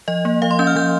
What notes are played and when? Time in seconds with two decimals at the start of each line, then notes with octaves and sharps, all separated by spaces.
0.08 F3 D#5
0.25 A#3
0.42 F3 F5
0.51 C6
0.59 C#4 G6
0.67 F6
0.76 F3 G6